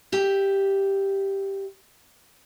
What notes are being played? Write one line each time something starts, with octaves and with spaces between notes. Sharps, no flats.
G4 E5